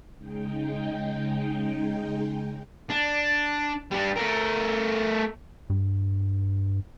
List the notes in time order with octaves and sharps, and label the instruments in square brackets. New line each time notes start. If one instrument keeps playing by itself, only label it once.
[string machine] C#3 G#3 D#4 G5
[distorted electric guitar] D4
G3 D4
A3 A#4
[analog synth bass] G2